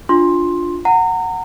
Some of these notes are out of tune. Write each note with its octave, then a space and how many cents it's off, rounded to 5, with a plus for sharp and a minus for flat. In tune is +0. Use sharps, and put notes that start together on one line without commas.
D4 +0 F4 +0 C6 +10
F#5 +0 A#5 -30